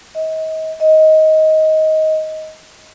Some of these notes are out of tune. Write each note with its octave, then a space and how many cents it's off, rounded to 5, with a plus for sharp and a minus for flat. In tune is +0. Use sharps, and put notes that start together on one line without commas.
D#5 +35
D#5 +15